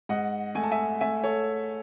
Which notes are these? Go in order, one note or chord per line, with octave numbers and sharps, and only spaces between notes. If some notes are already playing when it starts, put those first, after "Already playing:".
G#2 D#5 F#5
A3 G#5
A5
E5 G#5
A3 E5 G#5
A4 C#5